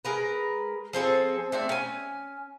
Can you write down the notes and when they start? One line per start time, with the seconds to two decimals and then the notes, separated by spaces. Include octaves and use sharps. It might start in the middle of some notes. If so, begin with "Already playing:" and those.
0.05 G#3 A#4 B4
0.93 F3 C4 G#4 A4
1.52 A3 C4 D4
1.69 C#4 G#5